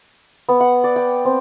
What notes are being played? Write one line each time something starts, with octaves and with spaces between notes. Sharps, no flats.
B3
F#5
D5
G5
C4